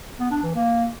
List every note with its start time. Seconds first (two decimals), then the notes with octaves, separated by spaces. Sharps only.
0.19 B3
0.31 D4
0.43 E3
0.55 A#3